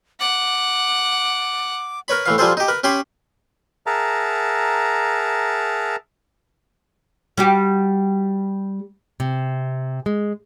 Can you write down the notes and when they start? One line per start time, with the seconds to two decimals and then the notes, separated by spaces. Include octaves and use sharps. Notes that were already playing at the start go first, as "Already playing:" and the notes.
0.21 F#5 D6
2.08 A#4 B4 C#5 B5
2.26 A2 E3 F5
2.38 F3 G3 F4 G#4 A4 C5
2.57 D#4 G4
2.68 A#4 B4
2.84 C#4 G4 G#5 B5 C6
3.87 G#4 A#4 E5 F#5 A5 A#5
7.38 G3 F#4 G4
9.20 C3
10.06 G#3